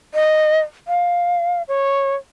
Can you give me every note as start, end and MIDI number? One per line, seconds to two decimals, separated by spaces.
0.14 0.60 75
0.88 1.62 77
1.68 2.16 73